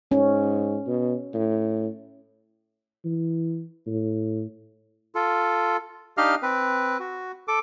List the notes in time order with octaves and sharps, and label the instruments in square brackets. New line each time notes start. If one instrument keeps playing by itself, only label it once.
[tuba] G#2 [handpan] C#4
[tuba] B2
A2
E3
A2
[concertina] F4 A4
D4 D#4 G4 D#5 F5 F6
C4 B4
F#4
A4 D6